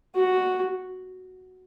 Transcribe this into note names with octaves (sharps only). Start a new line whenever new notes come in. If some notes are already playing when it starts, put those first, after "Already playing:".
F#4